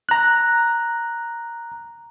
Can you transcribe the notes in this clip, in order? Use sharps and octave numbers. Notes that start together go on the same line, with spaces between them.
A#5 F#6